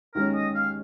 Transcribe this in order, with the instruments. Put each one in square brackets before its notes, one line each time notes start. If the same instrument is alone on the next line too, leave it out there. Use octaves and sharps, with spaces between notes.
[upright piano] D#2 D#3 G#3 C#4 [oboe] A#4
[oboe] D#5
F5